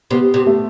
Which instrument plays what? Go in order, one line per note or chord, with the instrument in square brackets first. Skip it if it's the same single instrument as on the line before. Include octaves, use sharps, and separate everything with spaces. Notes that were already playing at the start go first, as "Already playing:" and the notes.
[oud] C3 [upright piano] B3
[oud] C3
[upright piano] A3